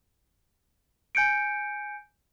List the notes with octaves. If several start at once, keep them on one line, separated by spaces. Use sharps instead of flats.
G#5 G6 C#7 D7